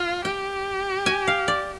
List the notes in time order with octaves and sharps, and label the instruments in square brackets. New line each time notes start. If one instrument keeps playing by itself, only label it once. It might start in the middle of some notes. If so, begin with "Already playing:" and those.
Already playing: [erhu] F4 [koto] F5
[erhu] G4 [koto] G5
[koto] G#5
F5
D5